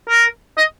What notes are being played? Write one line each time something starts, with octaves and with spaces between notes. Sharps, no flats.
A#4
D#5